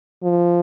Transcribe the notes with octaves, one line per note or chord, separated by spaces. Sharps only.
F3